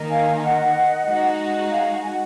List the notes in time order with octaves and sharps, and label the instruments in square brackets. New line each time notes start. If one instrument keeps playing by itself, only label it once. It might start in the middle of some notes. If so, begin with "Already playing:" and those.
Already playing: [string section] D#3 A#3 D#4 A#4
[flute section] F5 G#5
G#5
D#5 F#5
[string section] G#3 D#4 F#4
[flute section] F5 G#5
G#5
F#5